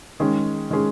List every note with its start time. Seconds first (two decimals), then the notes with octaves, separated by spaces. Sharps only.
0.20 D#3 G#3 C#4 G#4
0.70 D#3 G#3 C#4 G#4